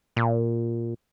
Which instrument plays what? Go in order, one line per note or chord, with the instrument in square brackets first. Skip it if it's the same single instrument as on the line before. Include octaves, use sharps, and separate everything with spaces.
[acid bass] A#2